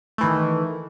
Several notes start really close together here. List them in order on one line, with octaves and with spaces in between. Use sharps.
A3 E3 D#3